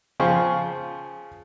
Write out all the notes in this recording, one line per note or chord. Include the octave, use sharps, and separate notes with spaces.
C#3 F3 G#4 C5 G5 C#6